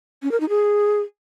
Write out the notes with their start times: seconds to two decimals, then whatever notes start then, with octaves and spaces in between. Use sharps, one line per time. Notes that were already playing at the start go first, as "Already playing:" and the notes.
0.23 C#4
0.31 A#4
0.40 D#4
0.49 G#4